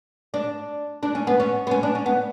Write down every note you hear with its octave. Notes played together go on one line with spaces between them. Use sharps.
D4
D4
C#4
B3
C#4
B3
C#4
D4
C#4
B3